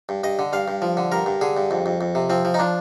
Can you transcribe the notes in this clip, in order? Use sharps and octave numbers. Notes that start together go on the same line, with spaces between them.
G2
G2 D#5
D3
G2 F5
G2
F3
D3
G2 A#4
G2
D3 G#4
G2
F2
F2
F2
C3
F3 C4
F3
D#4
F3 D4